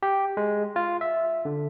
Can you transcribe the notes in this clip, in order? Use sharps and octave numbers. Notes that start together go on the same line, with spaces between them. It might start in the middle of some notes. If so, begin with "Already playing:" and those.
G4
G#3
F4
E5
D3